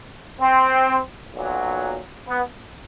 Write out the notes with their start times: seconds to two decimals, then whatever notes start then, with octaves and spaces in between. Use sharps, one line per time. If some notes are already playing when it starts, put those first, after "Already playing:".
0.41 C4
1.35 B1 A#2 F#3
2.27 B3